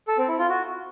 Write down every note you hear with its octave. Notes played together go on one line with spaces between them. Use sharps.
A4
C4
E4
F4
F#4